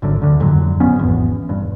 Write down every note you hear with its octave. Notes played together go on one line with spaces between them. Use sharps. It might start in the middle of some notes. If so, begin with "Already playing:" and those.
G#1 F#2 D3
D2 D3
F2 A2 D3 F#3
A#1 F2 B3 C#4
G#1 E2
E1 G2